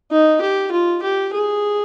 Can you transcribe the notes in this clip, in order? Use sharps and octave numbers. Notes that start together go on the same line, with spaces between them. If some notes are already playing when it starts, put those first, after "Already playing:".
D#4
G4
F4
G4
G#4